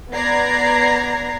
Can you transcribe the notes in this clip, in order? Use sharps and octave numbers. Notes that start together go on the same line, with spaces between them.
B3 D5 A#5 G#6 A#6 C7